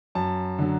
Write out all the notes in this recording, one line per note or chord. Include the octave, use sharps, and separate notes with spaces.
F#2 A5
D3 F#3